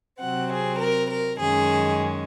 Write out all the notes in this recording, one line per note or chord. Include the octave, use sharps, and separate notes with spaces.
C3 F#3 C4 F#5
G#4
A#4
A#4
F#2 D#3 G#3 C#4 G#4